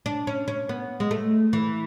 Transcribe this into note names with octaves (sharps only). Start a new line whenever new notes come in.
D4
C#4
C#4
B3
G#3
A3
E3